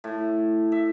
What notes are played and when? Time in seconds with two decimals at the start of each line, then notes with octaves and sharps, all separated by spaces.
0.04 A2
0.72 E5